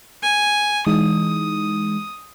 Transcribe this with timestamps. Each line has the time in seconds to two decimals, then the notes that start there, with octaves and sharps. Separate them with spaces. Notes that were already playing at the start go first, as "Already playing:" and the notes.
0.23 G#5
0.87 E3 G#3 D#4 D#6